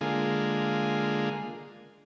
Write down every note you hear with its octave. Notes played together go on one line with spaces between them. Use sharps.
D3 G#3 A#3 F4 G#4